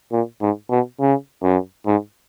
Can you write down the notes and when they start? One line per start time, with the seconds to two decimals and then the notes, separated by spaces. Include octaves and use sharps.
0.13 A#2
0.41 G#2
0.70 B2
1.00 C#3
1.43 F#2
1.87 G#2